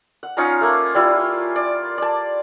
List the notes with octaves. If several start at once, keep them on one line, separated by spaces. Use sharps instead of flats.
F#5
C#4 D#4 F4 A#5
A3 A#3
G3 E4 F4
D5
D5 A5